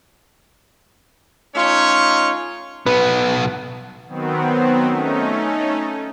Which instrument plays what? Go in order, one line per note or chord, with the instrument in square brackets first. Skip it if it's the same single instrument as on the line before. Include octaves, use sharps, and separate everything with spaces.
[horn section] A3 C#4 D#4 F4 C#5
[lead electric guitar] B1 B3 [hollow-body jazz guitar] B4
[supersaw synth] D#3 F#3 B3 C4
A3 C#4 D#4